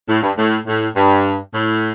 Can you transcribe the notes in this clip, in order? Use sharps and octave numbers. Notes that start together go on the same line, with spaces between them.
A2
G2
A2
A2
G2
A2